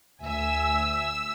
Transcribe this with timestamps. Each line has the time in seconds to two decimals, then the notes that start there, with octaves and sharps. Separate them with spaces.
0.21 D2 E5 G#5 E6